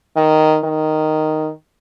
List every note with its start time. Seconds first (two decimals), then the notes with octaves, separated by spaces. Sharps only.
0.17 D#3
0.64 D#3